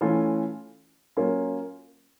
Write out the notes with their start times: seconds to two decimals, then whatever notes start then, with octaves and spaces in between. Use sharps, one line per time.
0.01 E3 A3 C#4 F4
1.17 F#3 A#3 C#4 F4